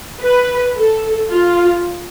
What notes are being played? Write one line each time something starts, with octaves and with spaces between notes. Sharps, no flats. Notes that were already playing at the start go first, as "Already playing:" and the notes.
B4
A4
F4